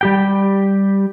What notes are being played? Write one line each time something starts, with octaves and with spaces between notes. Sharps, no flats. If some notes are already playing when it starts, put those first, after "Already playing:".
G3 G4 G5